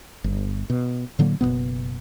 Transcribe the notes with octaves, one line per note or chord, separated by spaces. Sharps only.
G1
B2
A2 D3 F#3 A#3
F#1 F2 B2 B3